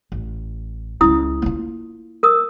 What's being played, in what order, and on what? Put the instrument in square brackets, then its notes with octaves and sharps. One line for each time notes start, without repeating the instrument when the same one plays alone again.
[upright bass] A1
[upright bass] C#2 C#4 [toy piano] E4 D#6
[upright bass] A#3 F4
[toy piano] A#4 D#6